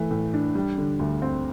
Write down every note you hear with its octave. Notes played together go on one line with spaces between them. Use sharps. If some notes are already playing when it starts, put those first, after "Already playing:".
Already playing: E3 A3
A2
D4
G3
D3
D2
C4